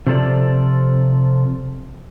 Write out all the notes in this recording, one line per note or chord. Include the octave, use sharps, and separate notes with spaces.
C3 F3 A4 D5